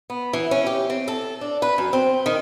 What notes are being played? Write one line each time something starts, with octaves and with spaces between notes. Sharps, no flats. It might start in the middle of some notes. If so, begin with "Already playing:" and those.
B3
E3
C#4
G4
C4
A4
D4
B4
F#2
C4
D#3